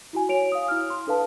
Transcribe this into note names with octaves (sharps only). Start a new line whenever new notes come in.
E4 F#4 G#5
F#4 C#5 D7 F7
F5 D#6
E4 F6
C6
D4 A4 B4 F5 A5